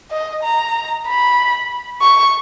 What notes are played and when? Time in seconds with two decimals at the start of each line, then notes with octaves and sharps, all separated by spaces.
0.11 D#5
0.44 A#5
1.07 B5
2.02 C#6